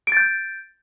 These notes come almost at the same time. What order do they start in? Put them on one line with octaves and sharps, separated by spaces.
D7 A6 G6